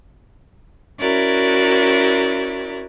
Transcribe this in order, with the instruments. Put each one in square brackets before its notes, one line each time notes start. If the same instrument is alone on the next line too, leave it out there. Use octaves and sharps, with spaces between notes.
[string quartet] C#4 E4 F#4 A#4 D5